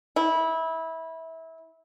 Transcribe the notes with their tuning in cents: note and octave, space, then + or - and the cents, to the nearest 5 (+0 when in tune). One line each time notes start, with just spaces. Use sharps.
E4 -20